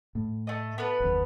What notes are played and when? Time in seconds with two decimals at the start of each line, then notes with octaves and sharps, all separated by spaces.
0.15 A2
0.47 A3 D#5
0.78 B3 A4 B4
1.00 F#1 D#2